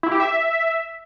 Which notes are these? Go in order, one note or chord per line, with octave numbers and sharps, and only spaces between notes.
E4
G4
E5